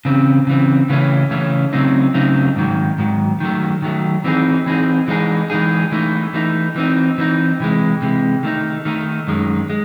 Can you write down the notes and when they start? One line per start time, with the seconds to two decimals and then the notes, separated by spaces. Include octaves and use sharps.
0.05 C#3 E3 C4
0.47 C#3 E3 C4
0.89 C#3 E3 A3 C#4
1.31 C#3 E3 A3 C#4
1.73 C#3 F#3 A3 C4 D#4
2.14 C#3 F#3 A3 C4 D#4
2.56 G#2 D#3 F#3
2.99 G#2 D#3 F#3
3.40 D#3 F#3 A3
3.82 D#3 F#3 A3
4.24 E3 C4 D#4 G#4
4.66 E3 C4 D#4 G#4
5.08 E3 G#3 D#4 G#4
5.50 E3 G#3 D#4 G#4
5.92 E3 A3 D#4
6.34 E3 A3 D#4
6.76 E3 C4 D#4
7.18 E3 C4 D#4
7.60 C3 E3 G#3
8.02 C3 E3 G#3
8.43 D#3 A3 D#4
8.85 D#3 A3 D#4
9.28 F#2 D#3 G#3
9.70 G#3